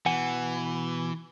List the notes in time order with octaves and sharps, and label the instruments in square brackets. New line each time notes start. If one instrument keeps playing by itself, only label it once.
[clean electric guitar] B2 F#5 G#5 [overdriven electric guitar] E3